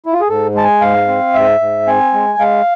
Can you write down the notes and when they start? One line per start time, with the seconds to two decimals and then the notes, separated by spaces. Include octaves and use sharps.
0.06 E4
0.13 F4
0.21 G#4
0.29 G#2 A4
0.55 G#3 A5
0.64 G#5
0.81 G#2 F5
1.07 C4
1.34 G#2 E5
1.60 G#2
1.87 C4 G#5
2.14 G#3
2.39 G#3 F5